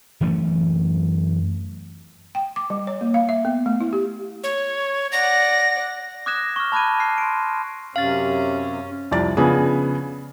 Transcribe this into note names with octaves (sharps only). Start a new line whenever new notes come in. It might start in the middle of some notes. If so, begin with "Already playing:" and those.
F#2 E3 A3 C#4
G5
D6
G3
C#5
A#3
F5
E5
B3
A3
E4
G4
C#5
D5 F#5 A#6
D6 D#6 F#6 G#6 A#6 E7
C#6 F6
A5 B5 D6 F#6 G#6 D#7
G#5 F6 F#6 C7
C6 D7
F#2 C3 C#4 F5 A6
C2 F2 D5 A6
C#3 F3 B3 D4 G#4